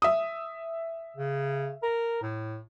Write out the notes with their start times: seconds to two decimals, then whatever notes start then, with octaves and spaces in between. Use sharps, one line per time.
0.02 E5 D#6
1.17 C#3
1.83 A#4
2.22 A2